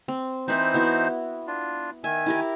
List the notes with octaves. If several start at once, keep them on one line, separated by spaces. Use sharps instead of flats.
C4
E3 C4 D#4 B4 C5 E5
B3 E4 F#4
D4 F4
D#3 E5 G#5
E4 G4 A#4